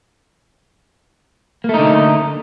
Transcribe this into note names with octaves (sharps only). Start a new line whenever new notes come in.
D3 A3 A#3 D#4